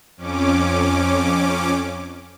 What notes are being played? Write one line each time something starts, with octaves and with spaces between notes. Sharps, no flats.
F2 C#4 D6